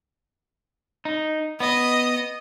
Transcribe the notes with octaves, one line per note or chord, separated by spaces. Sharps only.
D#4
B3 D#5